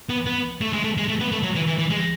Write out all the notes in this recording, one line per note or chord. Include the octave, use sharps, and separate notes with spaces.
B3
B3
A3
G#3
A3
G#3
A3
B3
A3
F#3
E3
E3
E3
G#3